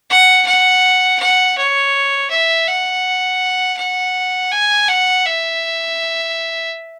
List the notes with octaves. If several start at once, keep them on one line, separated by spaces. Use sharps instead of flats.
F#5
F#5
F#5
C#5
E5
F#5
F#5
G#5
F#5
E5